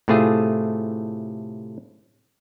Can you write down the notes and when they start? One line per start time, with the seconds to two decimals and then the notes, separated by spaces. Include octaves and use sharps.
0.08 A2 C3 A3 F4 G#4